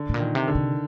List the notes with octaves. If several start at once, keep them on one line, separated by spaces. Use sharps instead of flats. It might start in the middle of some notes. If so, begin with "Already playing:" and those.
Already playing: D3
A2
A#2
D#3
C3
D3
C3